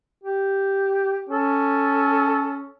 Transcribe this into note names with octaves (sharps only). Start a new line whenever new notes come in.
G4
C#4 A4